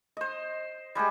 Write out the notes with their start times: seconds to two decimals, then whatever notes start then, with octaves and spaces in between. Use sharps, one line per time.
0.17 C5 D#5
0.95 G3 G#3 G4 G#4